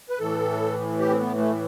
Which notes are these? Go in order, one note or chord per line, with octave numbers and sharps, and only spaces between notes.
B4
A2 E3 A4
G4
C4
B3
A3